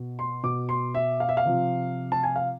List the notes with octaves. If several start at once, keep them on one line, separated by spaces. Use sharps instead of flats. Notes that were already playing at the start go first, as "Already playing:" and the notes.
Already playing: B2
C6
B2 D6
C6
E5
F5
E5
F5
C3 F3
A5
G#5
F5